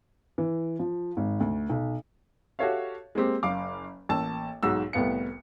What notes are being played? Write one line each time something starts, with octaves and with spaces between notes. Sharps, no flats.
E3
F3
G#1
D2
B1
F#4 G4 A4 C#5 E5 F5
G#3 A#3 C4 G4
F#1 F5 D6
A1 A#3 A5 E6
B1 G#2 F#4 E6
C2 A2 B3 B4 F5 C#7